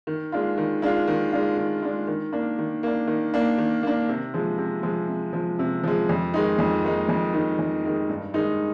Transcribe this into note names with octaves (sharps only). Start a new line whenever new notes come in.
D#3
G#3 D4 F4
D#3
G#3 D4 F4
D#3
G#3 D4 F4
D#3
G#3 D4 F4
D#3
A#3 D4
D#3
A#3 D4
D#3
A#3 D4
D#3
A#3 D4
C3
F3 G#3
C3
F3 G#3
C3
F3 G#3
C3
F3 G#3
F2
D#3 G#3 D#4
F2
D#3 G#3 D#4
F2
D#3 G#3 D#4
F2
D#3 G#3 D#4
G2
D#3 G#3 D#4